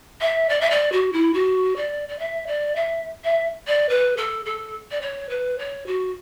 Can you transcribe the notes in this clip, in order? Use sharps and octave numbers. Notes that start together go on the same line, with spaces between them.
E5
D5
E5
D5
F#4
E4
F#4
D5
D5
E5
D5
E5
E5
D5
B4
A4
A4
D5
C#5
B4
C#5
F#4